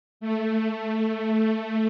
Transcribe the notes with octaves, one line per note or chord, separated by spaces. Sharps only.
A3